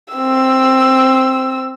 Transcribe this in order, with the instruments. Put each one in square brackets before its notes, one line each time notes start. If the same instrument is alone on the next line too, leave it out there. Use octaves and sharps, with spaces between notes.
[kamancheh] C4 E6